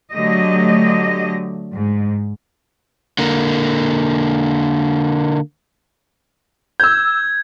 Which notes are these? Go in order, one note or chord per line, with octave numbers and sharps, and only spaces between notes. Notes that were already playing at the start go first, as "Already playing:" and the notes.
D3 F#3 A3 G4 D#5
G#2
D3 A#3
E6 G6 G#6